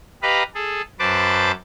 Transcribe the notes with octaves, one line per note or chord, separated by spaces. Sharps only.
G4 B4 D#5 F5 A#5 B5
G#4 A4
F#2 B4 C5 A5 D6